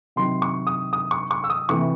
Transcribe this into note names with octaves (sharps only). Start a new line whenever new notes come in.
C3 D#3 F#3 C6
C#6
D#6
D#6
C#6
C#6
E6
D#6
C3 E3 A3 C#6